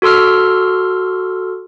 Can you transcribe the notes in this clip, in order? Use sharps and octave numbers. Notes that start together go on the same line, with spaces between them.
F#4 A4 C6 E6 F6